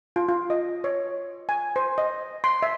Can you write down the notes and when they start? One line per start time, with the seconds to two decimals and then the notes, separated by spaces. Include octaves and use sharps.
0.16 F4
0.29 F4
0.50 D#5
0.84 C#5
1.49 G#5
1.76 C5
1.98 D#5
2.44 C6
2.63 E5